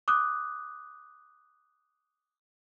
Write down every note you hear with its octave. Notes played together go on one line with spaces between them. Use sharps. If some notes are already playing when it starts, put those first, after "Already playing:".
D6 D#6 F#6